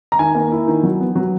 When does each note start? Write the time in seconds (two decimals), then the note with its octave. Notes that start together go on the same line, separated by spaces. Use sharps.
0.12 A#5
0.19 D#3 G#5
0.35 A#3
0.52 E4
0.67 D#3
0.83 F#3
1.00 B3
1.15 F#3